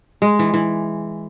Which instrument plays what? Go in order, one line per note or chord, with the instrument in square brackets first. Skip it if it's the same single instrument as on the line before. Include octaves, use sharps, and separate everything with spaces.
[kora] G#3
E3
E3